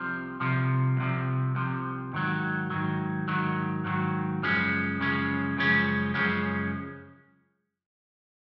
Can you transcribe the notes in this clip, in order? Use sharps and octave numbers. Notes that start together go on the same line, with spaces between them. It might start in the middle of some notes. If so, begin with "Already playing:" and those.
Already playing: C2 C3 F3
C2 C3 F3
C2 C3 F3
C2 C3 F3
G#2 D#3 F#3
G#2 D#3 F#3
G#2 D#3 F#3
G#2 D#3 F#3
F#2 C#3 F3 G#3 C#4
F#2 C#3 F3 G#3 C#4
F#2 C#3 F3 G#3 C#4
F#2 C#3 F3 G#3 C#4